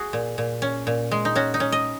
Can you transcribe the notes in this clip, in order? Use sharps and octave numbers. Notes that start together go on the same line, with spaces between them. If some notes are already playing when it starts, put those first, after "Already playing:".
Already playing: F#4 G#4
A#2
A#2
C#4
A#2
G#3
D#4
C#4 F#4
D#4
C#4
D#5